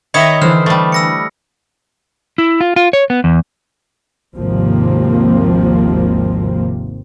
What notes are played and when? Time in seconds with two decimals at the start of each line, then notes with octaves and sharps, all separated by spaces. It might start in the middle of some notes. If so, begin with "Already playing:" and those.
0.14 D#3 C#5 D#5 E5 B5 D#6
0.42 D3 E3 C5 F6
0.66 G3 A3
0.92 E6 A#6 C#7
2.38 E4
2.61 F4
2.76 F4
2.93 C#5
3.10 B3
3.24 E2
4.33 G#1 D#2 C3 F3 A#3 C4